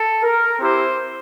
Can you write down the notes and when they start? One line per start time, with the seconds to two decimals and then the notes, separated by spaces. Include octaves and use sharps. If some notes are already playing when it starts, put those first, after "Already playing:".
Already playing: A4
0.23 A#4
0.59 C4 E4 G4 C5